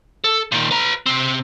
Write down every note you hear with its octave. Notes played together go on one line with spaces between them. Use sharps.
A4
A#2 D#3
B4 A#5
C3 C4